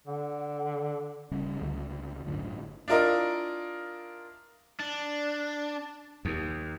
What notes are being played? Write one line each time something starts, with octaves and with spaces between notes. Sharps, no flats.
D3 F#5
D#1 C#3 G3 C#4
C#2 D3
G1 F#2 A2 D3
D4 E4 F4 A#4 D#5
D4
D#2